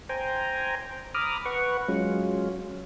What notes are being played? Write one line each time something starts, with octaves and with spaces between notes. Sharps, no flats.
C5 G5 G#5 A#5
A#5 B5 D6 D#6 F6
B4 F#5 C#6
F#3 G#3 C#4 F4